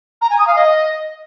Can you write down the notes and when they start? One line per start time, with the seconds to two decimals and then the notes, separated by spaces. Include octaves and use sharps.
0.22 A#5
0.30 G#5
0.39 D#6
0.47 F5
0.56 D#5